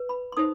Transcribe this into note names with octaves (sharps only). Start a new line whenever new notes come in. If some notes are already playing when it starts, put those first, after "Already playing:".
Already playing: B4
B5
C6
D#4 A4 C5 D#6